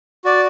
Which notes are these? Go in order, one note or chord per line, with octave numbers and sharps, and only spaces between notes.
F#4 D5